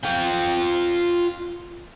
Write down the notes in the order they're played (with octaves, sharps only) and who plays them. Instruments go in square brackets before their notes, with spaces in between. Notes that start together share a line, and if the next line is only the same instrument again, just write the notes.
[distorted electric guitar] F4 G5